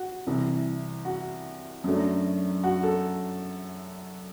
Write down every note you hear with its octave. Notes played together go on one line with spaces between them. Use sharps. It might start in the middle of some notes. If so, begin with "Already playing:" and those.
Already playing: F#4
C2 C3 E3
F#4
F#2 F#3 A3 D4
F#4
A4